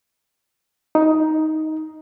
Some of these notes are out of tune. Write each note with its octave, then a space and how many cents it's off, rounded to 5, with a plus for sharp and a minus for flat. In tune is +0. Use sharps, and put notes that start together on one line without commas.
D#4 +10